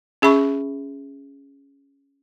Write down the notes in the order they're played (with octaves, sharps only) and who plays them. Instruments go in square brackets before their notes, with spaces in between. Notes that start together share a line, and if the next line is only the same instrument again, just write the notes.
[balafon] C#4 G#4 E5 B5 C#6